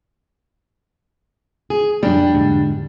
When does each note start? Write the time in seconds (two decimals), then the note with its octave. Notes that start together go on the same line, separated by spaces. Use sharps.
1.70 G#4
2.03 F2 G3 A#3 D4
2.34 E2 G#2 D3